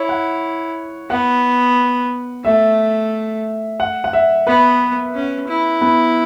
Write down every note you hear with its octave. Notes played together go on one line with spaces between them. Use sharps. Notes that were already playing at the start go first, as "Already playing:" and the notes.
Already playing: E4 C#5
F#5
B3 F#5
A3 E5
F#5
F#5
E5
B3 B4
C#4
E4
B3